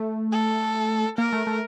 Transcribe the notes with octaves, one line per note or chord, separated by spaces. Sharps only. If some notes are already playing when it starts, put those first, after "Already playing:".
Already playing: A3
A4
A#3 A#4
A3
A3